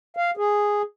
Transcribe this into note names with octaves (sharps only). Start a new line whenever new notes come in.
F5
G#4